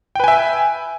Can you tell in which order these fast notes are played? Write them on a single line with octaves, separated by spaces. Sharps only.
G5 B4 G#5 E5